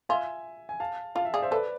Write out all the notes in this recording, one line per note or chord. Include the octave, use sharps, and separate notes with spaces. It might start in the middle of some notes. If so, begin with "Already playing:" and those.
F4 E5 G#5
G#5
F5 A5
F4 F5 A5
E5
G#4 D5 F5
C5 E5
A4 B4 D5